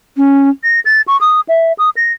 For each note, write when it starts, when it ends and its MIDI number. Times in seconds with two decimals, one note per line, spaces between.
0.17 0.49 61
0.64 0.80 94
0.85 1.02 93
1.08 1.19 85
1.21 1.41 87
1.49 1.73 76
1.78 1.90 87
1.97 2.13 94